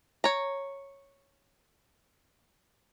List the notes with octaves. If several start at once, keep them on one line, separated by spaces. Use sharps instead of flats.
C#5 A#5